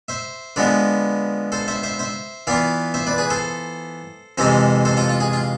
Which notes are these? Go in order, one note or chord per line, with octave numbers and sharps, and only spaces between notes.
C5 E5
D3 F3 G#3 B3 B4 D5
A4 C5
C5 E5
C5 E5
C5 E5
E3 B3 F4 D5 F5
C5 E5
B4 D5
G#4 B4
A4 C5
F2 C3 E3 G#3 C4 A4 C5
A4 C5
F4 A4
F4
G#4
F4